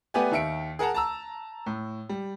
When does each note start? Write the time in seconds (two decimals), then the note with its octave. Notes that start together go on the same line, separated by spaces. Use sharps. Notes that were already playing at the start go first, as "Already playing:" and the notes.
0.14 A3 B3 G4 B4 D5 G#5
0.31 D#2 D#3 E5 C#7 D7
0.79 G#4 A#4 F#5 A5 A#5
0.94 A5 A#5 E6
1.66 A2
2.09 G3